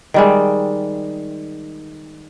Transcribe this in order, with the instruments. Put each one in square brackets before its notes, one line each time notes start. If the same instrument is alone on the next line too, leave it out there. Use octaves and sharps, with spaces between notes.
[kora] D#3 G3 G#3